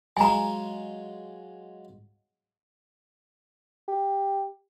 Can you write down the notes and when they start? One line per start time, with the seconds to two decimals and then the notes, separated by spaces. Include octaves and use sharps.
0.17 F#3 G#3 F4 G#5 A#5
3.88 G4